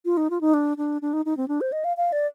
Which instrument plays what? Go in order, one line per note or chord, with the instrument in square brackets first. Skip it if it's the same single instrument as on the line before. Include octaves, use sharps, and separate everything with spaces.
[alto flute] F4
D#4
F4
D#4
D4
D4
D4
D#4
D#4
C4
D4
C5
D#5
F5
F5
D5